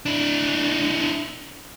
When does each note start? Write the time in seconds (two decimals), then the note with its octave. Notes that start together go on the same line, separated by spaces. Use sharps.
0.06 D4 E4